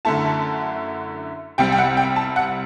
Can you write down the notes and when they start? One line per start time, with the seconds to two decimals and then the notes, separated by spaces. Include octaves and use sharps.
0.05 F#2 D3 A3 E4 A5
1.58 C2 C3 G3 G5
1.72 G5
1.78 F#5
1.97 G5
2.16 A5
2.36 F#5